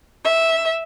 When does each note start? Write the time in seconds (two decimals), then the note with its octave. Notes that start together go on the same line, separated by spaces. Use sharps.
0.24 E5